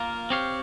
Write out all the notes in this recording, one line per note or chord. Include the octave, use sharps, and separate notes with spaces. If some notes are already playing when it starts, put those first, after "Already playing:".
Already playing: A#3 F4 A#4
C4 G4 C#5 F5